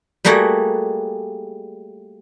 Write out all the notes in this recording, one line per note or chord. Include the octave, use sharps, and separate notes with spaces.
G3 A3 A#3 F#4 G#4 F#5